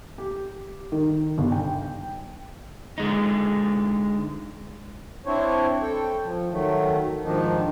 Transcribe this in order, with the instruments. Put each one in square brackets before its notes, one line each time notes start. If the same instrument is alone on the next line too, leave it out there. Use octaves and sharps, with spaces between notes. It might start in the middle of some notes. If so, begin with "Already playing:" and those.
[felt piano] G4
D#3
G1
G5
[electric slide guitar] D3 G#3 D#4
[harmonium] C4 D4 E4 C5 C#5
A4 G5
F3
D#3 F#3 A3
G#2 D#3 F3 D4 D#4